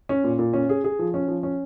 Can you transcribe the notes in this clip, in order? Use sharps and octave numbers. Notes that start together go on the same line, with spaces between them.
C#4
A#2
A#2
C#4
G#4
G#4
F3
C#4
F3
C#4